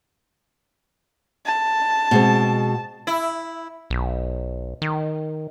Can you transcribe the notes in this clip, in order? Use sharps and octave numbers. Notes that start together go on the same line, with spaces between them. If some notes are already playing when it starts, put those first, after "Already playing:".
A5
B2 G#3 C4
E4
B1
D#3